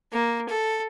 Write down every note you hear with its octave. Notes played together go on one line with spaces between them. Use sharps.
A#3
A4